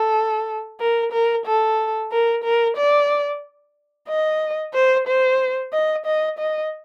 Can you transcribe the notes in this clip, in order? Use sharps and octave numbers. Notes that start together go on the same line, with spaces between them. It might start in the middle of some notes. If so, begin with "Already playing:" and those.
Already playing: A4
A#4
A#4
A4
A#4
A#4
D5
D#5
C5
C5
D#5
D#5
D#5